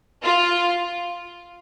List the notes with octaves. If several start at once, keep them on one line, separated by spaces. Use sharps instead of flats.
F4